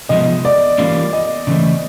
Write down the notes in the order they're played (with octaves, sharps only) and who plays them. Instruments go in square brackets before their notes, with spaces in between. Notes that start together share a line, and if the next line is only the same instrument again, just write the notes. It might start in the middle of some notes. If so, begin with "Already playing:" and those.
[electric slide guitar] C3 F3 G#3 B3 [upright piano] D#5
[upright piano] D5
[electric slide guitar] E3 G3 A#3 C#4 F4
[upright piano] D#5
[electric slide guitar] C#3 E3 A3 C4